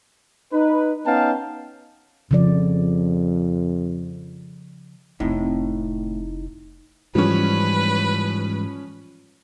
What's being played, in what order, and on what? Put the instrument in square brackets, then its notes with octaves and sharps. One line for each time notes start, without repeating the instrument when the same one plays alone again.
[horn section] D#4 B4
B3 C#4 D#4 F5 G5 A5
[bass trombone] F2 [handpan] C#3 F3 D5
[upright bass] F1 C4 [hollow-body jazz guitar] A2 [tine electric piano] D#4 E4
[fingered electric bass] G#2 E3 G3 [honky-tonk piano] F3 C#4 [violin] B4